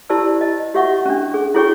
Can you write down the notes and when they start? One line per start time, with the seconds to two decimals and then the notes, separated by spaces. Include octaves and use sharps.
0.10 E4 G4 C5 D5 A5 E6
0.41 D#5
0.74 F#4 G4 C#5 E5 F#5 C#6
1.06 C#4 D4
1.34 G#4
1.55 E4 F#4 G#4 C#5 G5 C#6